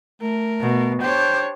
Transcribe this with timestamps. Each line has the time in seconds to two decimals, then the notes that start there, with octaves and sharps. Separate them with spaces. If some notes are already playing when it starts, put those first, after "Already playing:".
0.22 A3 A#4
0.61 B2
1.02 D4 G4 C5 C#5 G6